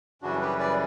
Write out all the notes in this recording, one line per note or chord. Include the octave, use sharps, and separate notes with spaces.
F#2 C#3 E3 G3 D4 F#4
G4 B4
B4 D5